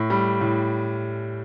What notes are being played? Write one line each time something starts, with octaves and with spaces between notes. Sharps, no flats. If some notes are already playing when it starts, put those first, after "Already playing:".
Already playing: A2
G3
A2